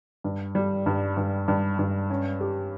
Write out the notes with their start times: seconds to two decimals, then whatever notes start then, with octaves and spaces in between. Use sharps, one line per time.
0.24 G2
0.55 G3
0.86 G2
1.17 G2
1.48 G2
1.79 G2
2.10 C#4
2.40 G4